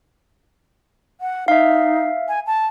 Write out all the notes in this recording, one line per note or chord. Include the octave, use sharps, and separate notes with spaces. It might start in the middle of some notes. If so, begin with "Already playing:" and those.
F#5
D#4 E5 F5
G#5
A5